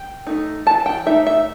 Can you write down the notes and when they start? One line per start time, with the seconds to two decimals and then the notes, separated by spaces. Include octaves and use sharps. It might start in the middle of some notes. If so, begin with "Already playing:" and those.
Already playing: G5
0.27 A3 D#4
0.66 E3 A5
0.86 G5
1.06 A3 D#4 E5
1.26 E5